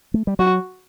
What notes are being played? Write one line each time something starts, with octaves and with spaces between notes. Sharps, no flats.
A3
G3
F#3 F#4